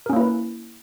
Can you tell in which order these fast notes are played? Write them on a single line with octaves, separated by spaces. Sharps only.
A#4 C#4 A#3 E4 B4